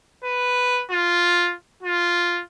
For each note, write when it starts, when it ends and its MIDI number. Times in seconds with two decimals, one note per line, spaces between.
0.24 0.84 71
0.91 1.54 65
1.83 2.42 65